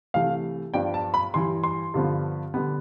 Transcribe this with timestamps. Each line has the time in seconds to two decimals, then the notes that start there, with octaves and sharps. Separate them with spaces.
0.14 C2 C3 E3 A3 F5
0.74 G2 F3 B3 D4 G5
0.94 A5
1.14 B5
1.34 G2 E3 G3 C6
1.63 C6
1.94 G2 D3 F3 B3
2.54 D3 G3 B3